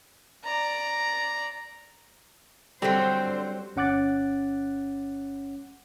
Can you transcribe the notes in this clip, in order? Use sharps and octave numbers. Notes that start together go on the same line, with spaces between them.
D5 A#5
D3 F#3 G3 C4 G4 C5 G5
G1 C#4 F#5 D6 F#6 A6